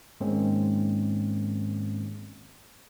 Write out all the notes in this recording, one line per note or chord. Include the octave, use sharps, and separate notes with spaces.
G#2 D#3 G#3 A#3 C4 C#4